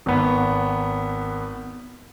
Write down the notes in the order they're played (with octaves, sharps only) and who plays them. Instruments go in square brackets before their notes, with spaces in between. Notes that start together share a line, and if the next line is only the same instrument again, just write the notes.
[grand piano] G#1 B3